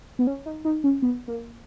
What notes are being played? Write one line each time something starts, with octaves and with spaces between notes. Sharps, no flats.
B3
C#4
D#4
D#4
C#4
B3
A#3